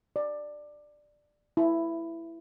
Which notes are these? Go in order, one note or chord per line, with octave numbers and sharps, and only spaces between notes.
D5
E4